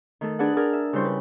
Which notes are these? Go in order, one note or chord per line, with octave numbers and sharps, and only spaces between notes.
D#3 A3 A4
D4 G#4 B4 D5 D#5 F#5
G#4 A#4 D5 F6
E5
C#3 G3 E4 C5 G5 C#6
B4